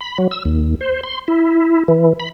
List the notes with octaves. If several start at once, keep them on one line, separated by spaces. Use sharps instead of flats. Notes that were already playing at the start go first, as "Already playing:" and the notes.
B5
F#3
E6
D#2
C5
C6
E4
E3
B5